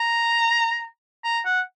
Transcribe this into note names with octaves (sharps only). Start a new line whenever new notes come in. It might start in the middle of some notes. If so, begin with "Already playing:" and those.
Already playing: A#5
A#5
F#5